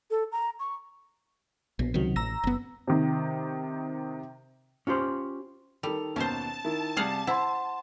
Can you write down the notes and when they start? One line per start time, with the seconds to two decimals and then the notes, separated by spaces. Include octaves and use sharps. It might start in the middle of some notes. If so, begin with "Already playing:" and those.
0.11 A4
0.32 A#5
0.60 C#6
1.79 A#1 B2
1.94 C#2 C3 D#3 F#3
2.16 A1 A#5 E6 A#6
2.44 F#1 B3
2.87 C3 D#3
4.87 C#4 F4 G4 C5
5.83 D#3 G3 A4 F7
6.16 D#2 B2 C#4 C5 A5
6.64 D#3 E4
6.97 C3 G3 G#4 F5 F#5
7.27 E4 C5 F#5 C6